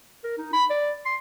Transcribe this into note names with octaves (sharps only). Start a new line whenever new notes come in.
A#4
D#4
B5
D5
C6